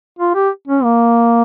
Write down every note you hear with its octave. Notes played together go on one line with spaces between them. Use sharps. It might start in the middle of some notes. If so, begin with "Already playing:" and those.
F4
G4
C#4
A#3